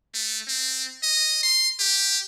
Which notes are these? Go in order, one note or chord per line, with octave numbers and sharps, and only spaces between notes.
A3
C4
D#5
C6
G4